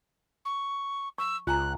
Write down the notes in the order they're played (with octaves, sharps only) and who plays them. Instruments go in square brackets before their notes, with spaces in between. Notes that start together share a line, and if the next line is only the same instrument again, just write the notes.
[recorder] C#6
[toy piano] C#6 [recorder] E6
[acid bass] C#2 [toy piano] F4 G#5 A#5 [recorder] F#6